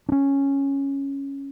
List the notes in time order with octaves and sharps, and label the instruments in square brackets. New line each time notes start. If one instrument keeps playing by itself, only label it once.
[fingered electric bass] D4
C#4